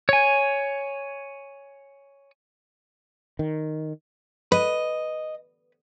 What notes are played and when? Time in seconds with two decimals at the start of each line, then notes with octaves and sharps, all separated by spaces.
0.09 C#5 G#5
3.39 D#3
4.52 B4 D#5